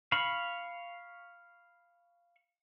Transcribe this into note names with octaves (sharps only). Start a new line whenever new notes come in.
F5 B5 C#6